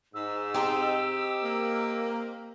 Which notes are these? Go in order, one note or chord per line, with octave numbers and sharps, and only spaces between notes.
G#2 E6
C4 D#4 G4
A#3